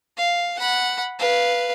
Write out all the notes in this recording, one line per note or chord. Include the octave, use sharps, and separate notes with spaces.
F5
F#5 B5
B4 F5